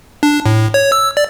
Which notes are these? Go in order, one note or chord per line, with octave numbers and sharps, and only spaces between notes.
D4
A2
C#5
E6
D5